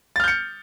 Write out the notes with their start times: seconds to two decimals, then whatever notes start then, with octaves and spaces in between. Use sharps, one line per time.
0.16 A6
0.20 F6
0.24 G6
0.28 C#7